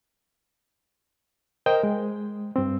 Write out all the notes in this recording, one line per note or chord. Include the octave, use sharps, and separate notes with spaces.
A#4 C5 D#5 G5
G#3
G2 C4